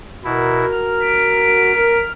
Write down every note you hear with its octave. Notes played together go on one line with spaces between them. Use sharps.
B2 E4 F#4 A#4
F6
B6 D7
A#4